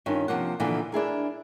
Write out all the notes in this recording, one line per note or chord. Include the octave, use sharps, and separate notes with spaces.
G2 D#3 C#4 F4
C3 F3 A#3 F#5
A#2 D3 E3 F3 B3
D4 E4 G#4 A#4